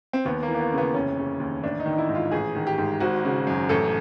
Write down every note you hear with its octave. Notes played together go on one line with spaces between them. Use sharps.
C4
D#2 B3
A#3
E3
A#3
B3
C#3
B3
F1 C#4
C#3
D#2
A1 D4
D#4
D#3
D#4
E4
G#2
F4
A1 G#4
D#3
G4
G#2
G#1 F#4
C#3
F#2
A1 A4